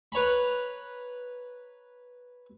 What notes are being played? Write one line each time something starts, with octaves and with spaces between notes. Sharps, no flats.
B4 C#5 A#5 B5